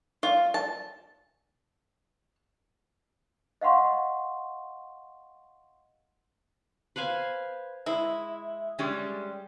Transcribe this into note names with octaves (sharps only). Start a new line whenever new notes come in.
F4
A5
D#5 F5 F#5 C6 C#6
B4 C5 F5 G#5
G#3 E4
G3 G#3 C#4